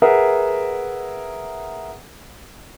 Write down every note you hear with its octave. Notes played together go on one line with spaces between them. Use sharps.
G#4 A#4 B4 E5 F#5